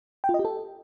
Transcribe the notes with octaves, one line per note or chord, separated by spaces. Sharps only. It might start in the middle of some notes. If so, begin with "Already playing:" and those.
G5
F4
D#5
G4
A4